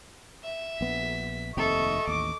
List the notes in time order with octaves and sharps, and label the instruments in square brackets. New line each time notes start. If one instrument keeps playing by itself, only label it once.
[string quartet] E5
[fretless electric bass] A#1 B3 [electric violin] B6
[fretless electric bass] F1 D#2 C4 [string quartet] A4 E5 [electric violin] D#5 C#6
[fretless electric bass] A1 D#2 [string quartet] D6